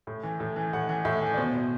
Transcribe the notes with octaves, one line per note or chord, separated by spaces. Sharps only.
A2
E3
A2
E3
A2 F#5
E3
A2 E5
E3
D5
B2 C5
B2